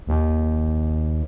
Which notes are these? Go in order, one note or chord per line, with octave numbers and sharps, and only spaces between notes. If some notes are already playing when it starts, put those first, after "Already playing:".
D#2